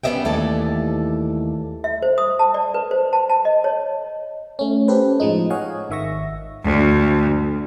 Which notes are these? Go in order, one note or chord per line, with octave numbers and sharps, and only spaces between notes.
G3 B3 C#4 D#5 E5 G5
D#2 E3 A3 A4 D5
E5
C5
D#6
A5
D5
B4
C5
A5
A5
D#5
C#5
A3 C#4
C#4 G4 A4 B4 C5
A2 F3 G#3 D#4
C#5 D#5 F5 F#5 G#5
G#1 D#3 E5 C#6 A#6
D2